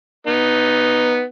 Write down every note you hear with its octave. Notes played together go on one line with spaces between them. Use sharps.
B3 D#4